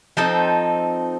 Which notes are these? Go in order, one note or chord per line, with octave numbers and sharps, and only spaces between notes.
F3 C4 D#4 A4